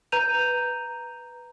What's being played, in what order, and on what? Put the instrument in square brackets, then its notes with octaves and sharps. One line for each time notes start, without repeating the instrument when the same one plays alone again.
[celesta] B4 A#5 G6 D#7 F7